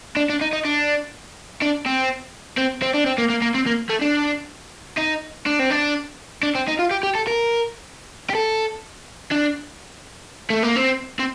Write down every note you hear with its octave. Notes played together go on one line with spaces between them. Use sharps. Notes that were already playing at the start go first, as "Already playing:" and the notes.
D4
D4
D#4
D#4
D4
D4
C4
C4
C4
D4
C4
A#3
A#3
A#3
C4
A#3
A3
D4
D#4
D4
C4
D4
D4
C4
D#4
F4
G4
G4
A4
A#4
G4
A4
D4
A3
A#3
C4
C4